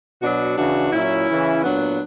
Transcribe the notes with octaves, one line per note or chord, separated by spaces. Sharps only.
B2 F#3 D4 F#4
C#3 E3 D4 F#4
A#2 F#3 C#4 E4
C#3 E3
A#2 F#3 B3 D4